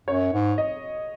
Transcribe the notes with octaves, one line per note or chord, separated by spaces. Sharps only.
F#2 C#5
G#2
D#5